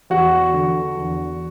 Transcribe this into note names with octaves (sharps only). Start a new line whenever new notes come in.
E2 F#4 F#5
D3
E2